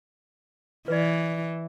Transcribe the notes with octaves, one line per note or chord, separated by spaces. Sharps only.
E3 B4 D5